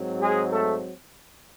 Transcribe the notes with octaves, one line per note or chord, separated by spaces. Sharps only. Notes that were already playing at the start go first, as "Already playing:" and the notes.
Already playing: G#2 F#3 C4
G#3 G#4
A3 A4